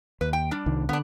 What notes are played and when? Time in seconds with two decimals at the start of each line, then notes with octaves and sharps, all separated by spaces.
0.21 D#2 B4
0.33 G5
0.51 G3 D4
0.66 C2 D#3
0.89 D3 B3 D4